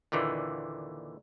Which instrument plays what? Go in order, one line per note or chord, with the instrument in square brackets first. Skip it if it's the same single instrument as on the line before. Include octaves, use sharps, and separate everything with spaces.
[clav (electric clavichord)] D#2 A#2 D3 E3